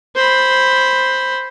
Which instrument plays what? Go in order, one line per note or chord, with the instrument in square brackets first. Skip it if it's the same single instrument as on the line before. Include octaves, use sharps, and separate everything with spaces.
[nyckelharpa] C5 B5